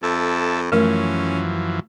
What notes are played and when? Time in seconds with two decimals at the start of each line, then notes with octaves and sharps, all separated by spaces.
0.03 F2 A4 E5
0.72 F#2 E3 F3 A3 C#4 A#4